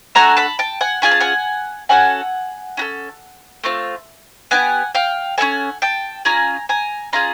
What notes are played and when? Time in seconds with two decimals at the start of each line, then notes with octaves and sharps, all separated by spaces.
0.15 A3 D4 F#4 A4 G#5 A#5
0.37 A5 B5
0.59 G5 A5
0.81 F#5 G#5
1.02 C#4 F4 G#4 G#5
1.11 A5
1.20 F#5 G#5
1.89 C#4 F#4 A4 F#5 G#5
2.77 C#4 F#4 A4
3.64 A3 C4 F4
4.51 B3 D#4 G4 F#5 G#5
4.95 F5 G5
5.38 C#4 E4 A4 F#5 G#5
5.82 G5 A5
6.25 C#4 F4 G#4 G#5 A#5
6.69 G#5 A#5
7.13 C#4 F4 G#4 A#5 C6